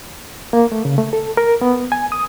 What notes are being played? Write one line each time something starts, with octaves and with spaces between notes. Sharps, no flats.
A#3
A3
C#3
A3
A4
A#4
B3
G#5
D#6